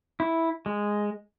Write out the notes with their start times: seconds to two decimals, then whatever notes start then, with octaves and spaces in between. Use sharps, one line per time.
0.20 E4
0.66 G#3